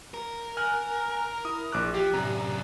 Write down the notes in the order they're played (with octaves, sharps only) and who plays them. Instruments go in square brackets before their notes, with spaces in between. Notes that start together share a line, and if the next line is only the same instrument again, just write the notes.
[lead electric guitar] A#4
[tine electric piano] G#5 A#5 F#6 [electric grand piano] F6
[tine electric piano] E4 [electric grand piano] D#6
[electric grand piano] A#1 D6 F#6
[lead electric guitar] F3 [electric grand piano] G4
[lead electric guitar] F#2 D4 [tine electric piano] A2 C3 [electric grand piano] A#5